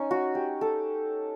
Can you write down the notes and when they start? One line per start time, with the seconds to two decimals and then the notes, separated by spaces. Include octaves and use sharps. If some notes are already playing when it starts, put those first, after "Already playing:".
Already playing: C#4 D#4
0.11 F#4
0.35 G4
0.61 A4